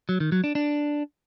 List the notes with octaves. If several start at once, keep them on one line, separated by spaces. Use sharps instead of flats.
F#3
D#3
F#3
D4
D4